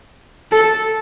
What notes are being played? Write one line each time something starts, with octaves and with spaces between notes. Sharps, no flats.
A4